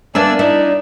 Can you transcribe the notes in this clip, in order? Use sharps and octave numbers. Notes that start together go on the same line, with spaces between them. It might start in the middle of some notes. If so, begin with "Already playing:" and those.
A#3 B3 D4 D5 E5 G#5 E6
D#4 E4 D5